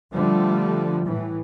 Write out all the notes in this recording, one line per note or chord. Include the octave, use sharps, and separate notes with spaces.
D3 F3 G3 A3
A2 E3